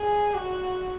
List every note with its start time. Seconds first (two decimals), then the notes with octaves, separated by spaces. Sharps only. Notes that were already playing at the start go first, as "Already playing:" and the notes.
Already playing: G#4
0.33 F#4